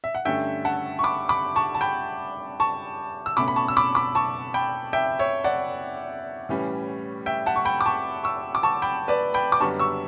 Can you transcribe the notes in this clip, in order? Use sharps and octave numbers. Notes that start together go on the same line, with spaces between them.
E5
F#5
G2 D3 A3 C#4 E5 G5
F#5 A5
C#6
B5 D6
B5 D6
A5 C#6
A5
G5 B5
A5 C#6
E6
B2 A3 C#4 B5 D6
B5
A5 C#6
E6
B5 D6
B5 D6
A5 C#6
G5 B5
E5 G5
C#5 E5
D5 F#5
A2 E3 G3 C#4
E5 G5
F#5 A5
C#6
G5 B5
D6
A5 C#6
C#6 E6
D6
A5 C#6
G5 B5
B4 D5
G5 B5
D6
F#2 D3 G3 B3 A5 C#6
C#6 E6